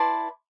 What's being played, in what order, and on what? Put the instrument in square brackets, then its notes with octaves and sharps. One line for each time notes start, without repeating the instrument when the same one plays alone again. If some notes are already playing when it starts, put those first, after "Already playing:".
Already playing: [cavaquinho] E4 B4 D5 A5 C6